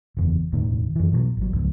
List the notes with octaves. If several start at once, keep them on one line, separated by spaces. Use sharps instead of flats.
F#1 E2
E1 D2 A2 D#3
F#2 E3
B2 F3 F#3
G#1 F#3
C#2 G#2 F3